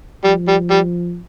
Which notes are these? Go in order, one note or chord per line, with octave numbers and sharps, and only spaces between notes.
F3 G3
G3
G3